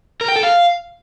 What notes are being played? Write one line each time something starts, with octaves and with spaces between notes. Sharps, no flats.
A#4
G5
A4
F5